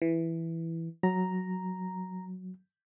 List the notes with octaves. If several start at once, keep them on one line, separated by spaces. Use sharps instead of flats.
E3
F#3 A#5